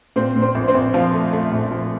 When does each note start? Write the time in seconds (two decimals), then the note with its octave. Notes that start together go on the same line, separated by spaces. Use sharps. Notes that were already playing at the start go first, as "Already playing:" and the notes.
0.16 A#2 C4 C5
0.36 A#2
0.42 C4 C5
0.55 A#1
0.68 C4 C5
0.75 A#1
0.94 F3 F4 F5
1.13 A3
1.33 A3
1.52 A#1
1.71 F3